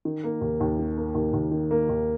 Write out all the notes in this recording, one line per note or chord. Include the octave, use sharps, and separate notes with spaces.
D#3
A#3
D#2
D#2
D#3
A#3
D#2
D#2
D#3
A#3
D#2